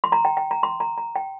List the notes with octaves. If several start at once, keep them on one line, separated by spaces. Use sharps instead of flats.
C6
A#5
G5
G5
A#5
C6
A#5
A#5
G5